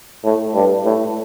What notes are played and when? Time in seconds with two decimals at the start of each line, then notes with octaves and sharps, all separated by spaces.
0.24 A2
0.54 G2
0.85 A2